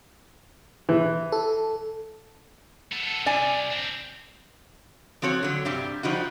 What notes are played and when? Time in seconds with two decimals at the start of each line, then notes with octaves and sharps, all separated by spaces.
0.89 E3
1.32 A4
2.92 B3 A4
3.26 C2 D5 G#5
3.71 C4 D4
5.22 F3 C4 F#4 C#5
5.43 D3 F#3
5.65 G2 C3 G3
6.03 F3 G3 D#4 F#4